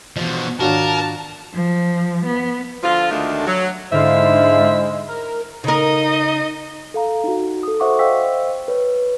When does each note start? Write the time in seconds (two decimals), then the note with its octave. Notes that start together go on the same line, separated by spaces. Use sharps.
0.16 B2 E3 F3
0.60 G#2 D#3 D4 F4 F#4 A#4 C#5 A5
1.54 F3
2.25 B3
2.83 D3 F3 F4
3.11 D2 D#3 G#3 A3 D4
3.47 F#3
3.91 G#2 D3 G#3 E4 C5 E5 F5
5.08 A#4
5.64 C#3 D#4 A#4 D#5
6.94 A4 F5 A#5
7.24 D#4 F#4
7.63 A4 D#6
7.80 F#4 C5 E5 F#5 C#6 D6
7.99 C5 D#5 F5 G5 E6 B6
8.68 B4 C#5